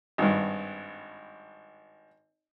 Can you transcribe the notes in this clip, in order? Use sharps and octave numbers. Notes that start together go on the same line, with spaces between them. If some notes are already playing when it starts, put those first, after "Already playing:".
G#1 G2